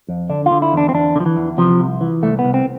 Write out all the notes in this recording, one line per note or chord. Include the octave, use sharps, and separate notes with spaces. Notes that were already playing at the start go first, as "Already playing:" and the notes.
F2
D3 D4
F4
D3
E4
E2 D4
C4
E2 D4
D3
F3
E3
E2
C3 F3
C2
E3
C2 A3
B3
C2
C4